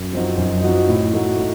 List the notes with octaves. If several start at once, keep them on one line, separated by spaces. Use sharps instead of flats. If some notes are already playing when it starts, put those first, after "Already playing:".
Already playing: F#2
F3 C4 D#4 F#4
F#2
F3 C4 D#4 F#4
A2
A3 D#4 F#4
A2